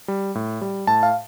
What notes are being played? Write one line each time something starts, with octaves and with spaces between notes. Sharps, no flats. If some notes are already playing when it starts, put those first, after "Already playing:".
G3
A2
G3
A2 A5
F5